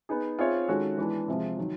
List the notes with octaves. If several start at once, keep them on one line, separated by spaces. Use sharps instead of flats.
B3 D#4 G#4
C4 F4 G#4 C#5 E5
D#3 G#3 C#4 F#4 A4
E3 G#3 B3 D4
C3 F3 G#3
D#3 F#3